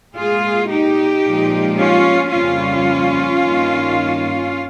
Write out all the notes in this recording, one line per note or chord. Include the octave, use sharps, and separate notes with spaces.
A#2 G#3 F4 G#4
D#4 G4
A#2 F3 G#3
C#4 F4
F2 C#3 G3 A#3 C#4 F4
G2 D#3 A#3